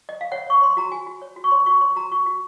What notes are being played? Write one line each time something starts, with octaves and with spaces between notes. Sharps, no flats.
D#5
F5
C#5 F#5
C#5 C#6
C#5 C6
F#4 A#5
F#4 G#5
F#4
C#5
F#4
C#6
C#5 C6
F#4 C#6
C#5 C6
F#4 A#5
F#4 C#6
F#4